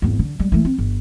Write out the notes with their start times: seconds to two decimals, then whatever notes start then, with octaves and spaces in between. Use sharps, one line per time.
0.02 G#1 E2
0.19 D3
0.39 G3 G#3
0.52 E3 A3
0.65 C4
0.78 G1